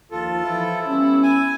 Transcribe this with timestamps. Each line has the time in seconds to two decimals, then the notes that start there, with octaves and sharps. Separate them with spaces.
0.11 D#2 F3 F4 A4
0.44 E3 F3 E4
0.87 G3 B3 C#4
1.23 G#5